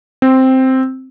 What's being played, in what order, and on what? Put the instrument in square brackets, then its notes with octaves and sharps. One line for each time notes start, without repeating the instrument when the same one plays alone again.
[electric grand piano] C4